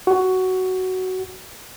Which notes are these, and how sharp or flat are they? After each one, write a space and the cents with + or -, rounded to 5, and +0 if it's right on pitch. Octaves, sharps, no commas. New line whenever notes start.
F#4 +10